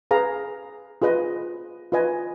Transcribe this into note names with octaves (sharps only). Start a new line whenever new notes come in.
G#4 B4 F5 A#5
F4 G#4 B4 D#5
F4 B4 D#5 G#5